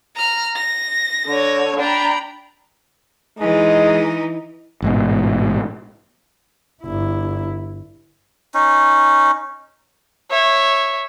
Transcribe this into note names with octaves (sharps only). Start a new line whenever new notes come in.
A#5 F6
A#6
D3 C#5
D4 G5 A#5 B5
E3 G#3 D#4
A1 G#2 B2
G1 E4
C#4 D#4
C#5 E5